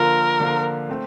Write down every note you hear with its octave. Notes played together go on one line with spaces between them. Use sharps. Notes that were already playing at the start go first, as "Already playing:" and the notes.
Already playing: D3 F3 A#3 F4 A#4
D3 F3 A#3 F4
A3 C4